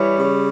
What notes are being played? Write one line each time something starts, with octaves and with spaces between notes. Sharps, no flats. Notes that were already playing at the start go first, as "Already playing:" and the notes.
Already playing: E3 G3 C#5
C#3